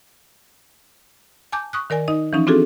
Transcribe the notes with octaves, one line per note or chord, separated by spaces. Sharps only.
G#5 A5 D6 G6
C#6 D#6 F#6
D#3 A#4 D5 G#5
D#4 D#5
E3 F3 C#4 D#4
C4 D4 F4 F#4 G#4 A4